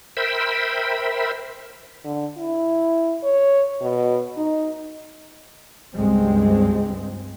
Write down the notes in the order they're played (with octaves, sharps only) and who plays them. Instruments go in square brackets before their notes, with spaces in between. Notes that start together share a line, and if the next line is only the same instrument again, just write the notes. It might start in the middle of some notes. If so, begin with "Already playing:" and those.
[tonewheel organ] A#4 C5 E5 G5 B5
[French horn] D3
E4
C#5
B2
D#4
[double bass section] C#2 G2 G#3 C4